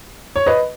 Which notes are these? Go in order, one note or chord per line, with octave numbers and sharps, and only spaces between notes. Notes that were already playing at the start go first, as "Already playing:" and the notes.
C#5
B4 D#5